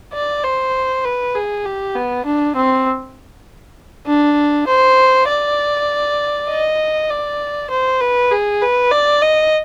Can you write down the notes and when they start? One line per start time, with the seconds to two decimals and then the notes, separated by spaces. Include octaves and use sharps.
0.14 D5
0.44 C5
1.04 B4
1.35 G#4
1.65 G4
1.95 B3
2.25 D4
2.56 C4
4.07 D4
4.67 C5
5.28 D5
6.50 D#5
7.10 D5
7.70 C5
8.01 B4
8.31 G#4
8.62 B4
8.92 D5
9.22 D#5